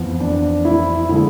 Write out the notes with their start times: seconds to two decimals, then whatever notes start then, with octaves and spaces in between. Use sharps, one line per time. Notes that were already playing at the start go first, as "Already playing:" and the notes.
Already playing: F2 E3 B3
0.20 D4
0.65 E4
1.09 D3 G#3 E4